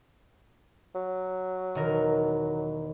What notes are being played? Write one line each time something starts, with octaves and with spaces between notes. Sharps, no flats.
F#3
E1 D#3 A#4